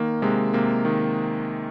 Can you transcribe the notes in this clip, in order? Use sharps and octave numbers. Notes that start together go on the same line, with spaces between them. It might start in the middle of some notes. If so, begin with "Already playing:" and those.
Already playing: D#3 A#3
C3 G#3
C3 A#3
D#3